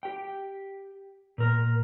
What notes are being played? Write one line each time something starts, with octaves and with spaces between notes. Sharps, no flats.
G4 G5
A#2 A#4